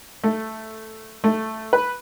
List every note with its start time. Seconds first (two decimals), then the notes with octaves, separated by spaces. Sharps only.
0.24 A3
1.24 A3
1.73 B4